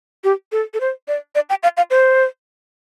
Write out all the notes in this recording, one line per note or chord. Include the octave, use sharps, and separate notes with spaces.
G4
A4
A4
C5
D5
D5
G5
F5
F5
C5